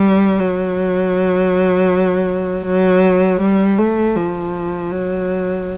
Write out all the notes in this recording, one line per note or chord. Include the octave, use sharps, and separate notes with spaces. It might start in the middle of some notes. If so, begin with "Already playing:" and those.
Already playing: G3
F#3
F#3
G3
A3
F3
F#3